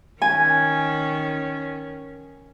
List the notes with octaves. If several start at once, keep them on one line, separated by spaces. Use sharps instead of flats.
D#3 C#4 G#5